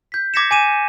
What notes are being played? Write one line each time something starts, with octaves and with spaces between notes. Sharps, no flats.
G6 B6
D6 G#6 A#6 B6 C#7 E7
G#5 D6 D#7 E7